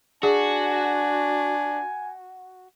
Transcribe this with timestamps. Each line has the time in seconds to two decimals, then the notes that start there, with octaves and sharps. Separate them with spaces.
0.23 D4 F#4 G#4 G#5